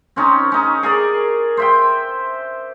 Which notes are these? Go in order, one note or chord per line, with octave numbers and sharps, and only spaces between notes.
C4 C#4 D#4
C#4 D#4
G#4 A#4 D5
C5 E5 G5